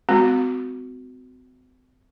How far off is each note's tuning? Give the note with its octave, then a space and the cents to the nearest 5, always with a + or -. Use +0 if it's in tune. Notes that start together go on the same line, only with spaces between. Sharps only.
G#3 +0 C4 -40 F#4 +0